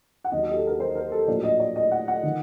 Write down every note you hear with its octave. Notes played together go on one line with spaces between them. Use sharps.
F#5
D#2 D#3 F#3 D#5
D#5
G4
A4
A#4
C5
A#4
A4
A#1 A2 F#3 D5
D#5
D5
D#5
F#5
F#5
D#3